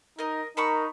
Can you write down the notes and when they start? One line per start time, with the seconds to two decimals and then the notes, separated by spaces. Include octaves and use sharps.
0.19 D#4 A#4 D#5
0.57 D#4 A#4 A5 B5 C#6